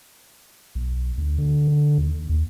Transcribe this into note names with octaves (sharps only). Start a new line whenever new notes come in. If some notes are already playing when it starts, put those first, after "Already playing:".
B1
D2
D3
D3
D#2
D#2